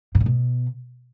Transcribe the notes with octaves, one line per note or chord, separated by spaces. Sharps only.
A2
A#2
B2